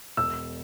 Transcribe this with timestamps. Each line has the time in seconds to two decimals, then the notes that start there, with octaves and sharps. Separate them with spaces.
0.17 E1 E6